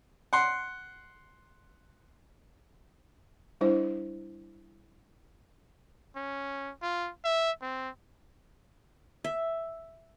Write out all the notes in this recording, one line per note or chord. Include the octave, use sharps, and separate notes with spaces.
F#5 C6
G3 D4 E4 C5 D#5
C#4
F4
E5
C4
E5